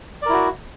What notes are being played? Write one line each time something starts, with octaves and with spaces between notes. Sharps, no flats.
E4 F#4 A#4 D5